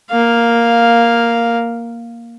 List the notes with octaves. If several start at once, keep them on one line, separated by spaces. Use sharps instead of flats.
A#3 F5